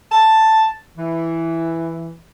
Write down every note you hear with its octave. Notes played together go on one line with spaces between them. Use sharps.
A5
E3